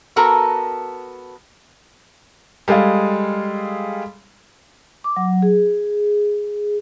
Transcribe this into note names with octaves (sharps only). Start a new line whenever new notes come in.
B3 F#4 A4 A#4 A#5
G3 G#3 G#4 A4 F5
D6
F#3
G#4